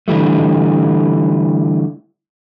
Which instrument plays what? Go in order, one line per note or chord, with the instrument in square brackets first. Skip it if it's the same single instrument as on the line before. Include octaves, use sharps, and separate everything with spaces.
[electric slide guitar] D3 E3 G3 A3